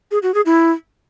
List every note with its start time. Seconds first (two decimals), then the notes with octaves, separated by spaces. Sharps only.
0.11 G#4
0.23 F#4
0.34 G#4
0.45 E4